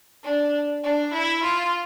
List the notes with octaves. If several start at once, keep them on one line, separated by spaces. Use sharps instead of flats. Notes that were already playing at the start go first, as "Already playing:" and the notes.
D4
D4
E4
F4